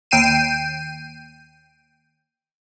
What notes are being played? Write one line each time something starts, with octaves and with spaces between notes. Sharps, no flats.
D#2 G5 C7 D#7 E7